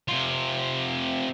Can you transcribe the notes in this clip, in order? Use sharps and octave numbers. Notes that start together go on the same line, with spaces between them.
C3 F4